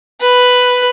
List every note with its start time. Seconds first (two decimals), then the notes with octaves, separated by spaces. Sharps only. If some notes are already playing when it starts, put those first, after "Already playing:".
0.20 B4